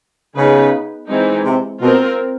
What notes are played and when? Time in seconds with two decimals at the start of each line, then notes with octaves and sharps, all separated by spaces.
0.36 C#3 B3 D#4 G#4 B4
1.08 E3 G#3 C4 D#4
1.44 C3
1.81 B2 C4 F4 A#4